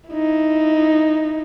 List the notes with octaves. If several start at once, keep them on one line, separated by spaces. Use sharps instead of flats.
D#4 E4